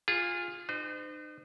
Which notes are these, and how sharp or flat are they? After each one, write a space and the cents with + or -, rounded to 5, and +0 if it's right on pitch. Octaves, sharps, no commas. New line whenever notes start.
F4 +5 G#4 -25
D#4 -40 C5 -35